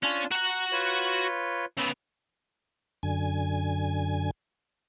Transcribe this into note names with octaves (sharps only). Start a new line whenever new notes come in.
C#4 D4 F4 A5
F#4 F#5 A#5
F4 B4 C#5
C#3 B3 E6
F#2 D3 G#5